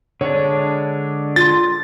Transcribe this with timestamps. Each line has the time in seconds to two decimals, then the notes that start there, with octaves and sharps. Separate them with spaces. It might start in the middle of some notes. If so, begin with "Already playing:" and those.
0.21 D3 G#3 D4 C#5
1.36 F4 C6 A6